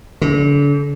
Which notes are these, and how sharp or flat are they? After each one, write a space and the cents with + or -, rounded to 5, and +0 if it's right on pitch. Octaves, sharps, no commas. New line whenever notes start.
D3 -40